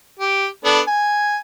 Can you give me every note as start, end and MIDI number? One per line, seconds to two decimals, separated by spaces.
0.19 0.47 67
0.65 0.80 59
0.65 0.80 62
0.65 0.80 69
0.88 1.38 80